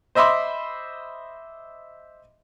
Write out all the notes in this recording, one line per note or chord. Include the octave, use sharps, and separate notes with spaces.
C5 D#5 E5 B5 C6 D6